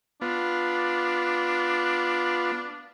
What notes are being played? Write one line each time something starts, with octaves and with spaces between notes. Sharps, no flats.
B3 D4 F4